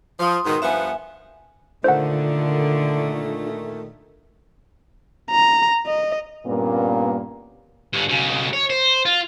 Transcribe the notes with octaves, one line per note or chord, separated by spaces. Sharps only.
F3 C6 D#6
G#2 B2 D#3
G2 F3 B3 E5 G#5
A#2 D3 D#3 A3 D4 F4 C5 F#5
A#5
D#5
G2 A#2 A#3 B3 C#4
G2 D3
B1 C#3
C#5
C5
F4